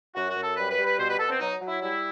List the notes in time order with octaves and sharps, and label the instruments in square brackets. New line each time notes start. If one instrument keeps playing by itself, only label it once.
[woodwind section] F#2 F#4
F#4
F#2
A4
G3 B4
B4
G3
B4
B2 C5
B4
B2 A4
C4
F#3 D#4
F#3
E4
G3 E4